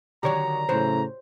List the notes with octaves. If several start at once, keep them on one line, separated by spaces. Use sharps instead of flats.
D3 D#3 F#3 G4 C#5 A#5
A2 C#3 E3 F#3 C5